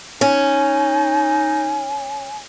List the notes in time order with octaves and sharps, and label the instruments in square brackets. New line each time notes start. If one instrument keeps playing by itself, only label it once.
[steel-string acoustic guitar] C#4 [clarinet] D#4 [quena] G#5